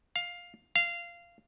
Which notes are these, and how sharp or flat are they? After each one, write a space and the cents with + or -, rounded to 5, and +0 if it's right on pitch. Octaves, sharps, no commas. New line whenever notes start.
F5 +10
F5 -15